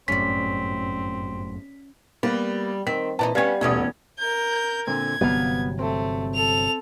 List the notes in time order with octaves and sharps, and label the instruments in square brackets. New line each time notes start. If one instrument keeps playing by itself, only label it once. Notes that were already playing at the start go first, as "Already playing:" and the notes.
[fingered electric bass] G1 F#2 A2 [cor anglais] C4 [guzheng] C#4 D5 [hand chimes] B6
[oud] G3 [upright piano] A#3 B3
[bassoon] D#3 [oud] C4 [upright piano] B6
[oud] A#2 D4 D#4 [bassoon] E3 [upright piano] A5
[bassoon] G3 [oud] B3 C#4 [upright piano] F5 G#5 G#6
[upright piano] D#1 A1 D#6 [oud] E2 B2 C#4
[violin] A#4 G6
[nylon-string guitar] A#2 D3 C4 [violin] G#6
[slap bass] G1 C3 F#3 [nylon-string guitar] B3 D5 F5
[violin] A3 [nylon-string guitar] C4
[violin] A4 F7